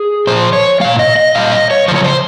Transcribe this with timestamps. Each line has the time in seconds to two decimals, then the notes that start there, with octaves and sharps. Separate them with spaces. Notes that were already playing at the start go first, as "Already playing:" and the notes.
Already playing: G#4
0.27 A#2 F3 C5
0.53 C#5
0.80 A#2 G3 F5
0.99 D#5
1.16 D#5
1.35 A#2 G3 F5
1.52 D#5
1.71 C#5
1.88 F3 C5
1.91 C#3 C#5
2.04 C5